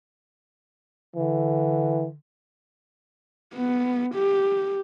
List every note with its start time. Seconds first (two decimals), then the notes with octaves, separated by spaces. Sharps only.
1.16 D3 E3
3.55 B3
4.14 G4